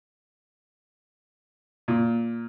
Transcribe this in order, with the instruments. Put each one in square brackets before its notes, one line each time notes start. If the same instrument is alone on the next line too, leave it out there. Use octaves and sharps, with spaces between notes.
[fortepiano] A#2